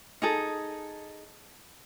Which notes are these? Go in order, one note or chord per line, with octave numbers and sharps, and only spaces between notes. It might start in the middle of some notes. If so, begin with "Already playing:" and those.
D#4 G#4 A4